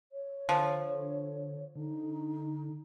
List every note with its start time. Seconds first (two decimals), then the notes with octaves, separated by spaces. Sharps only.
0.12 C#5
0.49 D3 F3
1.76 D3 D#4